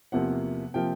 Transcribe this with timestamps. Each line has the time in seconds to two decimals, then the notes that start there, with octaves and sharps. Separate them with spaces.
0.12 E2 C3 F3 A#3 F#5
0.74 C3 F3 A#3 G5